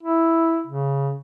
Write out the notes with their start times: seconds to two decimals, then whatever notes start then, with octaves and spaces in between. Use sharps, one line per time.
0.03 E4
0.67 C#3